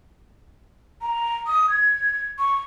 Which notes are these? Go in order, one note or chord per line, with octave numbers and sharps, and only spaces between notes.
A#5
D#6
G#6
C#6